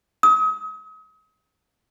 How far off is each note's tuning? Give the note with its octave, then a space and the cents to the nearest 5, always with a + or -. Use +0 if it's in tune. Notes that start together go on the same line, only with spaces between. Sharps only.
D#6 +40